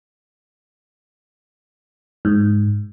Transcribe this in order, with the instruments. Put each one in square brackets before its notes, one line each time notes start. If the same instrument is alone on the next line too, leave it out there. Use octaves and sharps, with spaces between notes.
[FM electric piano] G#2